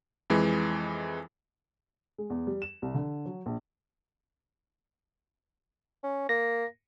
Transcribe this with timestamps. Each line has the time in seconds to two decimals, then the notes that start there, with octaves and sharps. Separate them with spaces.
0.30 F2 E3 G#3
2.18 G#3
2.30 E2
2.47 G3
2.62 E7
2.82 C2
2.94 D3
3.26 F#3
3.46 A#1
6.03 C#4
6.29 A#3 A#6